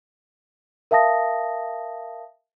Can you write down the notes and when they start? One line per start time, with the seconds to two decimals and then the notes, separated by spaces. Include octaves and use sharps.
0.91 A#4 E5 F5 A5 D#6 A#6